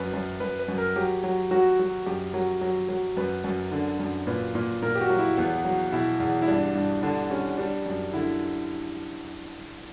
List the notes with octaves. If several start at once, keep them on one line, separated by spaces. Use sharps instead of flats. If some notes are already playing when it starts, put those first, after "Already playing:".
Already playing: F#2 B4
F#2
F#2 B4
B4
F#2
A#4
F#3 G4
F#3
F#3 F#4
F#3
F#2 G4
F#3
F#3
F#3
F#2 B4
F#2
D3
F#2
A#2 B4
A#2
A#2 A#4
G4
F#4
F#3
E4
E2 B3
F#3
B2 E4
E2
E4
G2 D4
G2
D3 D4
G3 C#4
G3 D4
F#2
D3 E4